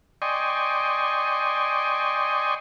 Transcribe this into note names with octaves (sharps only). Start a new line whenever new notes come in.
D5 D#5 G5 G#5 C6 C#6